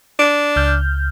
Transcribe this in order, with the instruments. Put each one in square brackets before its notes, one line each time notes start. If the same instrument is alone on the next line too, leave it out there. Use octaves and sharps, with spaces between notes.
[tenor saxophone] D4
[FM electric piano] C#2 F6 G6